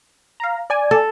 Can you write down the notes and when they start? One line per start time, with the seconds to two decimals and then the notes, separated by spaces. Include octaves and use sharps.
0.40 F5 A#5
0.70 D5 G#5
0.91 A4